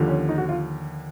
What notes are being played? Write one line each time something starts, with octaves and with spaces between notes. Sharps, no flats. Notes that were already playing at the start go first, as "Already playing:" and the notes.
Already playing: D#2 D3 F3
C#4
D#4
F#4
F4